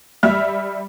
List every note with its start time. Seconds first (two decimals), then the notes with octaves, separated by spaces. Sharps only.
0.23 G3 E5 F6